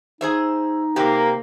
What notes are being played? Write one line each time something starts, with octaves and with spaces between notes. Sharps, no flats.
D#4 G#4 C5 E5
C3 A#3 C4 G4